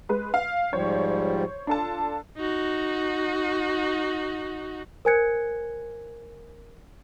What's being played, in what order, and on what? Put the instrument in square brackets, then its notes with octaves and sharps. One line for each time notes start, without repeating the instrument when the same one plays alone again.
[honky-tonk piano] G#3 B4
F5
[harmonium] G#2 F3 G3 [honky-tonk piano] C5 C#5
[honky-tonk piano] D4 A4 A5 [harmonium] F4
[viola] D#4 F#4
[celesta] A#4 C5 G#5 F#6 G#6 C#7